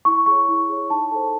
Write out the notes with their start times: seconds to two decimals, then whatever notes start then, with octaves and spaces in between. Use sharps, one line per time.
0.05 E4 C#6
0.26 G#4 C#5 C#6
0.49 E4
0.69 G#4 C#5
0.90 D#4 A5
1.12 A4 C5